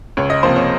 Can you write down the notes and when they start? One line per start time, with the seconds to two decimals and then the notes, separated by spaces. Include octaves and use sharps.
0.17 C#2 C#5
0.30 D#5
0.43 C3 F3 A#3 C5
0.56 C#5